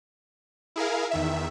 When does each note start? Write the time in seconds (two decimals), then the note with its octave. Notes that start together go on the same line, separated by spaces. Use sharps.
0.76 E4 G#4 A#4 F5
1.11 E2 D#3 E5